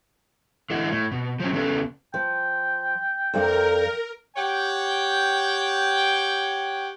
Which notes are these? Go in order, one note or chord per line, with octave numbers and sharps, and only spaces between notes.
D3 E3 E4 D#5 F#5
A2
B2
F3 F#3 C#4
C#3 B3 C#4 G#4 A4 B4
F3 G5
F2 A#4 D5 F5
G4 C#5 F#5 G5